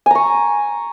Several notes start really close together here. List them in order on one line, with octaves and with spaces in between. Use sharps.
G#5 A#5 C#6